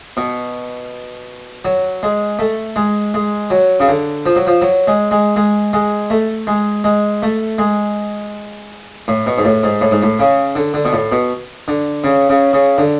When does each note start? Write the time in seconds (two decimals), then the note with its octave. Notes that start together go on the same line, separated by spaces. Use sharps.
0.17 B2
1.65 F#3
2.03 G#3
2.39 A3
2.76 G#3
3.14 G#3
3.50 F#3
3.80 C#3
3.88 D3
4.26 F3
4.36 F#3
4.47 F3
4.62 F#3
4.88 G#3
5.11 G#3
5.36 G#3
5.73 G#3
6.10 A3
6.47 G#3
6.84 G#3
7.23 A3
7.58 G#3
9.08 A2
9.27 B2
9.38 G#2
9.45 A2
9.63 G#2
9.81 A2
9.91 G#2
10.03 A2
10.19 C#3
10.56 D3
10.74 D3
10.85 B2
10.93 A2
11.12 B2
11.68 D3
12.04 C#3
12.29 C#3
12.53 C#3
12.78 D3